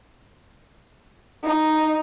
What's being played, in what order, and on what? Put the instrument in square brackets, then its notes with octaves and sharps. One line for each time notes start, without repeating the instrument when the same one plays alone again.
[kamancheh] D#4